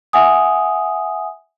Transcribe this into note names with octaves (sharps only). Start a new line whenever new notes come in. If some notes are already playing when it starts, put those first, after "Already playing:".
E5 F#5 G#5 D#6